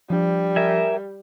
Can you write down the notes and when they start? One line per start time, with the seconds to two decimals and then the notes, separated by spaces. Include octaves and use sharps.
0.10 F3 G3 D4
0.56 A#4 E5 G#5